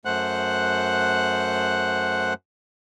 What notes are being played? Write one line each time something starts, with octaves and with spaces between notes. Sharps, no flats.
F#2 A3 C5 F#5 F#6